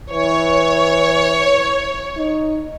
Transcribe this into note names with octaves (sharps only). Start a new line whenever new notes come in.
E3 C#5
D#4